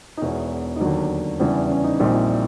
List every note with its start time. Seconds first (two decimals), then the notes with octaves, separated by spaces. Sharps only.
0.17 D#4
0.21 E1 E2 B2 E4
0.76 D#4
0.81 D#2 D3 F#3 D4
1.40 E2 C#3 E3 G3 D4
1.70 C#4
1.84 D#4
2.00 A#1 A#2 G3 C4 D#4
2.14 E4